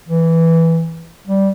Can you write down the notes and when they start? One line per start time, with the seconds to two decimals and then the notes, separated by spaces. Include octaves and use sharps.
0.08 E3
1.27 G3